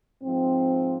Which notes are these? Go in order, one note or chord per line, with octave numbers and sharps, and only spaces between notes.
G#2 F3 C4